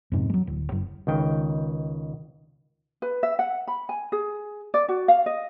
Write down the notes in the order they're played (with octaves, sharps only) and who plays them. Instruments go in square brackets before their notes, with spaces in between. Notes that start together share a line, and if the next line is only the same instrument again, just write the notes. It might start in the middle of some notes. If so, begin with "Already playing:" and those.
[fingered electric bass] F2 G#2 C3
F#3 G#3
D1
F#1
[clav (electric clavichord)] C#2 D#3 G5
[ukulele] B4
E5
F#5
B5
G#5
G#4
D5
F#4
F5
D#5